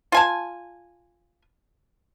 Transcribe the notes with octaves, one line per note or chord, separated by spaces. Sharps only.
F4 G#5 A5